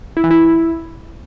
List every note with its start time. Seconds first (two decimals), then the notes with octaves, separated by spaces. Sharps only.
0.17 E4
0.24 E3
0.31 E4